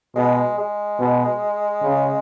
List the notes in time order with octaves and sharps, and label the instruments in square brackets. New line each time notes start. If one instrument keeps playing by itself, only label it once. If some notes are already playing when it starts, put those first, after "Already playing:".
[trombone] B2 [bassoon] G#3
[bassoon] G#3
[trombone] B2
C#3